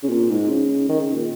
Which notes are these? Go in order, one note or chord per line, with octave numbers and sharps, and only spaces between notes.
C#3
A#2
G#2
C#3
D#3
C#3
A#2